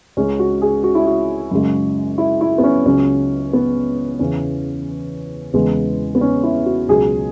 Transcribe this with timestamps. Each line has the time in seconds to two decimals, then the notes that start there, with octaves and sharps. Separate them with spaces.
0.17 C#2 C#3 G#3 C#4
0.39 F#4
0.62 G#4
0.84 F#4
0.95 E4
1.06 F#4
1.51 F#2 C#3 G#3
2.18 E4
2.41 E4
2.58 B3
2.63 C#4
2.85 C#2 C#3 F#3 C#4
3.53 B3
4.19 E2 C#3 E3 C#4
5.54 E2 C#3 E3 G#3 B3
6.15 B3
6.21 C#4
6.43 E4
6.66 F#4
6.88 C#2 B2 F#3 G#4